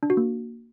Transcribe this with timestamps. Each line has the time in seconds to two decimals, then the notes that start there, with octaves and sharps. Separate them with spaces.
0.03 D4
0.10 F#4
0.17 A#3